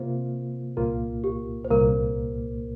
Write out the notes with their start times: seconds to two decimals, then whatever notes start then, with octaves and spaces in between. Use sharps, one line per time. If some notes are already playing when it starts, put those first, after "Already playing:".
Already playing: C3 A#3 F4 C5
0.77 C2 A#2 A#3 F4 A#4
1.24 G4
1.65 C5
1.70 C2 A#2 A#3 A#4